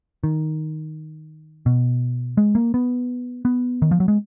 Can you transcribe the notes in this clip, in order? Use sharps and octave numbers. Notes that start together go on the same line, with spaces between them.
D#3
B2
G#3
A#3
B3
B3
D#3
F3
F#3
G#3